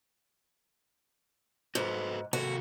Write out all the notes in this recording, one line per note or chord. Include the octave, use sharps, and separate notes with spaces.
G#2 F#4 A4 B4
C3 A#3 F#4 A4